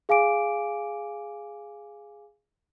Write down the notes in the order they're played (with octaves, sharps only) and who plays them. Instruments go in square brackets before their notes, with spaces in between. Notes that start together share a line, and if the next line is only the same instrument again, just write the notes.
[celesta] G#4 F5 G#5 D6 D7